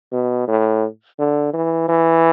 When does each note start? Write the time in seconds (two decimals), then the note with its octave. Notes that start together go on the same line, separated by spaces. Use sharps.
0.12 B2
0.48 A2
1.19 D3
1.53 E3
1.89 E3